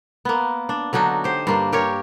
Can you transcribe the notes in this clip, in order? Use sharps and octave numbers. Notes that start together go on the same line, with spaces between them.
A#3 B3
D4
D3 F#3 D4 D#4
G4 C5
G2 A#3 D4
G4 A#4 C#5